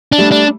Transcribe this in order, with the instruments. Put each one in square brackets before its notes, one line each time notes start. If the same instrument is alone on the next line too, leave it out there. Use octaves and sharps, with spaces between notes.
[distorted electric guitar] D4
[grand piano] G3 A3
[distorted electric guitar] D4